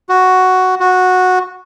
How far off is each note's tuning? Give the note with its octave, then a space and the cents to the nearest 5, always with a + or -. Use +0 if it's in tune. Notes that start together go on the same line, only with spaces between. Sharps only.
F#4 +5
F#4 -10